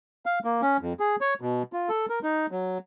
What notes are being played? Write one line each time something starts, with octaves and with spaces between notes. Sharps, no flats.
F5
A#3
C#4
F2
G#4
C#5
B2
F4
A4
A#4
D#4
F#3